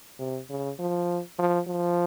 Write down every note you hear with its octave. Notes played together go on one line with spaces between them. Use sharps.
C3
C#3
F3
F3
F3